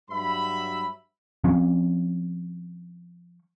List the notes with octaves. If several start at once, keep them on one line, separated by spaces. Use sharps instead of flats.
G2 F#3 E5 B5
F3 C4 C#4